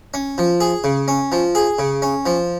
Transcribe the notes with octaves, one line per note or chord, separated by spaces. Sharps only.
C#4
F3
G#4
C#3
C#4
F3
G#4
C#3
C#4
F3